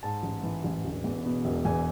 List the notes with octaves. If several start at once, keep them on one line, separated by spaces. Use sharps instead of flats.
G#2 A5
A1
E3
A1
E1
E2
B2
E1
E2 G#5